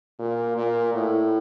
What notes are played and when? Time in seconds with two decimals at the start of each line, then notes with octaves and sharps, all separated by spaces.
0.19 A#2
0.57 A#2
0.94 A2